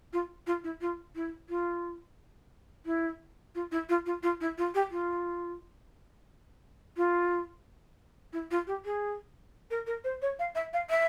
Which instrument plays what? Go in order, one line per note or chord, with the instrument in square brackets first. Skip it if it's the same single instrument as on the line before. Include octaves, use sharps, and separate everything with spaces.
[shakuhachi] F4
F4
E4
F4
E4
F4
E4
F4
E4
F4
F4
F4
E4
F4
G4
F4
F4
E4
F4
G4
G#4
A#4
A#4
C5
C#5
F5
E5
F5
E5